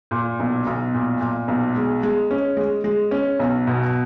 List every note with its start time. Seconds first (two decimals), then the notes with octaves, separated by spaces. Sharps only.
0.11 A#2
0.40 B1
0.67 B1
0.94 A#2
1.21 A#2
1.48 B1
1.76 G#3
2.03 G#3
2.31 C#4
2.57 G#3
2.84 G#3
3.11 C#4
3.39 B1
3.67 B2